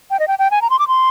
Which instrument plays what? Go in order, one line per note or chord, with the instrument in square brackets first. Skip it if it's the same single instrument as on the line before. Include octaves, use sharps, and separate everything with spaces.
[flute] G5
D#5
G5
G5
G#5
A#5
C6
D6
C6